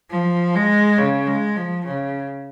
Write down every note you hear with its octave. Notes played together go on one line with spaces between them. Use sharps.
F3
G#3
C#3
G#3
F3
C#3